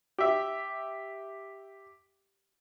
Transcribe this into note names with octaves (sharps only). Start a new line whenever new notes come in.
G4 E5